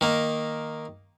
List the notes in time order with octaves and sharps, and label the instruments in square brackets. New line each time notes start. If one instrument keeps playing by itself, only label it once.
[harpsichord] D#3 A#3